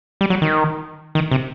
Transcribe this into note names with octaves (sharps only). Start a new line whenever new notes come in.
G3
F#3
D#3
D#3
C3